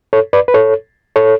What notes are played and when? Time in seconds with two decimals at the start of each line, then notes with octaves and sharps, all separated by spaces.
0.13 A4 C#5
0.33 B4 D5
0.48 B4
0.54 A4 C#5
1.16 A4 C#5